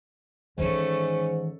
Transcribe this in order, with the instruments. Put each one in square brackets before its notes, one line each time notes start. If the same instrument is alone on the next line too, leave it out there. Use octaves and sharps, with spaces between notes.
[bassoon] G#2 [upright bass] D#3 E3 [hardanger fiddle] A3 C#4